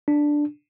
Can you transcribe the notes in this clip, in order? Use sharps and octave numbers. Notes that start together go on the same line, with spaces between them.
D4